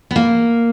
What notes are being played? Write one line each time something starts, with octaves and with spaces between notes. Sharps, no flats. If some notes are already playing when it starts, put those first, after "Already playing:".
B3
A#3